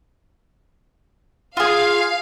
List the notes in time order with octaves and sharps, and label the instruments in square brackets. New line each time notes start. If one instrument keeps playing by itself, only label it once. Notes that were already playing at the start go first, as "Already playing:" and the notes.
[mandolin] F4 G#4 [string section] F5